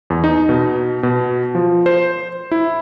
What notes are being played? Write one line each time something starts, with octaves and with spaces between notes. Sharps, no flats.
E2
D#4
B2
B2
F3
C5
E4